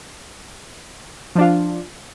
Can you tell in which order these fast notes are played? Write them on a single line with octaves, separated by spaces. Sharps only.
F3 D4 F4